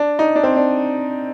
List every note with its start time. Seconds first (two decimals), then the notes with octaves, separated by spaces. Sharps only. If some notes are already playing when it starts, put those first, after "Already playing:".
Already playing: D4
0.19 D#4
0.36 D4
0.44 C4
0.56 D4